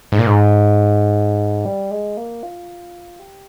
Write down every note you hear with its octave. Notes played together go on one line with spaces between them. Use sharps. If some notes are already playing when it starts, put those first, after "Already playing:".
G#2
A#2
G#2
G3
G#3
A#3
F4
G4